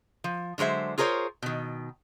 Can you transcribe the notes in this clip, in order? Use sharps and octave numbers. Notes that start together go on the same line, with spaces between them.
F3
D3 F#3 G#3 C5 E5
F4 G#4 A#4 C5 C#5
B2 D#3